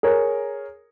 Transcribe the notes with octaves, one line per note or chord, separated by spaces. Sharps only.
G#4 A#4 C#5